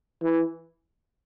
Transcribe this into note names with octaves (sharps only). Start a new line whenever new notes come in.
E3